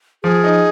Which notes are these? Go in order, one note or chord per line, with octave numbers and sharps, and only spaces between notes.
F3 G#4
D#4